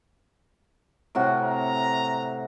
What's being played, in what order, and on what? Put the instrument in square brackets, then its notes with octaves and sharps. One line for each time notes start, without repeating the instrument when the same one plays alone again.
[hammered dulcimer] A2 C3 F#4
[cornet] A#5